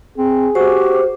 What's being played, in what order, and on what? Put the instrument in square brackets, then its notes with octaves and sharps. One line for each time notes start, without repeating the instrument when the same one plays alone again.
[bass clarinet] C4 [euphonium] G#4
[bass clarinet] F#4 [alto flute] G4 [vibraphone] C5